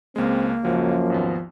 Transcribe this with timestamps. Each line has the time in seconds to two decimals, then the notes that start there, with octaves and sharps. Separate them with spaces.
0.16 C#2 G#3 A#3 C4
0.65 C#2 F#2 F3 F#3
1.10 G#1 D#2 B3